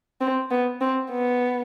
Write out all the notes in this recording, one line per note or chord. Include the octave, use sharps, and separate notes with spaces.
C4
B3
C4
B3